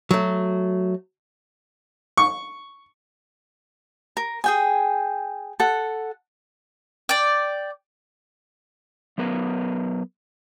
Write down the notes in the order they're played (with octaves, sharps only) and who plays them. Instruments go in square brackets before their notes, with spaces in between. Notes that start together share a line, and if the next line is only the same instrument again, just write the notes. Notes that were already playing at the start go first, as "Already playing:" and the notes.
[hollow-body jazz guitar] F#3 A3
[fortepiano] C#6
[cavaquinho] A#4
G#4 G5 G#5
A4 F#5
[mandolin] D5 G5
[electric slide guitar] F#3 B3 A#4 B4